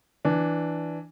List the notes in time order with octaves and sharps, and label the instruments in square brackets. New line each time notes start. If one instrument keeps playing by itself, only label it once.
[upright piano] E3 D4